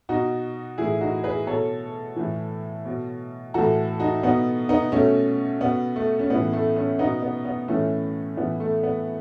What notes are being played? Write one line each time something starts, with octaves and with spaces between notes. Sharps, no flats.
B2 D#4 F#4
A2 E3 E4 G#4
D#4 F#4
G#4 B4
B2 A4 C#5
A2 E3
B2
A2 E3 F#4 A4
D#4 F#4
B2 B3 D#4
B3 D#4
B2 A3 C#4
B2 B3
A3
C#4
A2 E3 B3
A3
A3 C#4
B2 B3 D#4
B3
B3
A2 E3 A3 C#4
A2 E3 B3
A3
B3